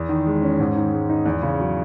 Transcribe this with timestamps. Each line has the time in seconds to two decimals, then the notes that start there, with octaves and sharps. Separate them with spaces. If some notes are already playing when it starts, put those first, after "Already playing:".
Already playing: E2
0.09 D#3
0.26 G#3
0.42 C#4
0.60 G#2
0.76 D#3
0.92 G#3
1.09 D#4
1.25 E2
1.43 C#3
1.59 F#3